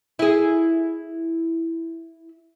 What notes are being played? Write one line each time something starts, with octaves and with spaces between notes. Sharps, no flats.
E4 G#4